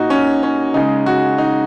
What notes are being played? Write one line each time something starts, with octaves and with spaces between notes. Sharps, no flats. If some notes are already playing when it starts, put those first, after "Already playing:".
Already playing: A#2 A#3 D#4 F#4
C#4
C#4
C#3 G#3 D#4
F#4
D#4